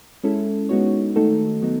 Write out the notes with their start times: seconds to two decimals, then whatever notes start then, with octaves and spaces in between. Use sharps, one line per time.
0.24 G#3 C#4 E4 A4
0.69 G#3 B3 D#4 F#4 C#5
1.16 D#3 A3 D#4 F#4 A4
1.62 F#3 B3 D#4